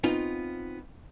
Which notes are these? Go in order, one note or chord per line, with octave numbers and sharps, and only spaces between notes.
B3 C4 D#4 F4